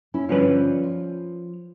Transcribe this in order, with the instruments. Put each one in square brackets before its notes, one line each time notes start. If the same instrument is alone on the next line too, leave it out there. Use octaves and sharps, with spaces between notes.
[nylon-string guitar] C#4 E4
[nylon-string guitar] G2 D3 [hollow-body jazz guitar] F3 C#4 B4
[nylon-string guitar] F4